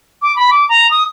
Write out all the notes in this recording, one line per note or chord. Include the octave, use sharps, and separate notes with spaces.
D6
B5
D6
A#5
D#6